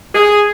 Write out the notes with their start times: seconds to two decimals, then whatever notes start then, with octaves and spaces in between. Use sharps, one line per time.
0.15 G#4